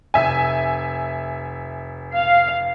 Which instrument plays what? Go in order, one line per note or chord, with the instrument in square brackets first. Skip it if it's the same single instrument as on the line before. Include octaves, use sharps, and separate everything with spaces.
[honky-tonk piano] F1 E5 G#5
[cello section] F5